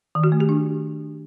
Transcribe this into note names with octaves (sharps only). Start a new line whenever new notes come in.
D#3
F#4
A3
G4
D4